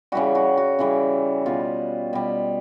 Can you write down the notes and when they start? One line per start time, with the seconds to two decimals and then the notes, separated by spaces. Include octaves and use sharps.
0.12 C#3 E3 G3 F#4
0.35 F#4
0.57 F#4
0.79 C#3 E3 G3
1.46 B2 G3 F4
2.13 B2 G3